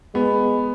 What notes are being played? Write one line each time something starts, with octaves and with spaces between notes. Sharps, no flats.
G#3 B3